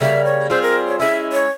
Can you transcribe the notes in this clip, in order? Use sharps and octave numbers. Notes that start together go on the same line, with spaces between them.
C#3 G3 A#3 E5
C#5
G3 C4 F4 G#4 C5
A#4
C#5
G#3 C#4 E4 E5
C#5